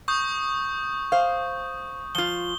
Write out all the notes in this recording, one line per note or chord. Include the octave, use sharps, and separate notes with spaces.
C#6 D#6 G6
C5 F5
F3 F4 G7